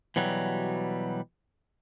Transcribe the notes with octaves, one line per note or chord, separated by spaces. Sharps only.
B2 E3 F#3 G3